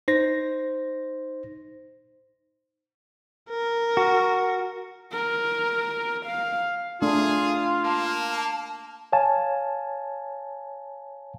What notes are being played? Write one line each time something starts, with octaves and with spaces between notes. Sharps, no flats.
D#4 C5 A#6
A#4
F#4
A#4
F5
A3 D4 F4 G#4
A#3 A5
C#5 F5 G#5 A5